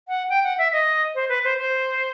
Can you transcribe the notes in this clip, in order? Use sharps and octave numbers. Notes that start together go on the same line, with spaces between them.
F#5
G5
F#5
E5
D#5
C5
B4
C5
C5